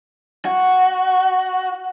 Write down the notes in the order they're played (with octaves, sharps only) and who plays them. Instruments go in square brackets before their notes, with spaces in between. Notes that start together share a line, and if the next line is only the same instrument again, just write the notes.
[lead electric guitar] F#4